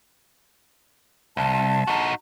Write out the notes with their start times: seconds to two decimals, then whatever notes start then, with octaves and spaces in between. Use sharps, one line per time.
1.37 C2 A5
1.87 D#4 F#4